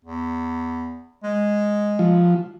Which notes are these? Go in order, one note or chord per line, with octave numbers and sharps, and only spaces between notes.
E2
G#3
F3